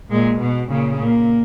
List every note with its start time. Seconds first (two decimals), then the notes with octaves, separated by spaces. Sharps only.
0.11 A#2 G#3
0.40 B2
0.70 A#2 C#3
0.99 A#2 A#3